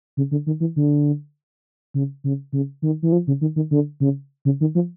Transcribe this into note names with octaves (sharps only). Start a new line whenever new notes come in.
C#3
D3
D#3
E3
D3
C#3
C#3
C#3
D#3
E3
F3
C#3
D#3
D#3
D3
C#3
C#3
D#3
F3